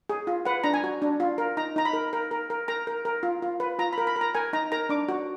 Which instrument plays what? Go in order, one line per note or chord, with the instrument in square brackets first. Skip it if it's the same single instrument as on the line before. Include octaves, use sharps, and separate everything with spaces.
[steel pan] G#4
F4
B4 F#5
D4 A#5
G#5
F#4
D4
F4
A#4
D#4 A#5
D#4 A#5
B5
A#4
A#4
A#4
A#4
A#4 A#5
A#4
A#4
F4
F4
B4
F4 A#5
B5
A#4
B5
A#4
A#5
A#4 G#5
D#4 A#5
A#4 A#5
D4 D6
F#4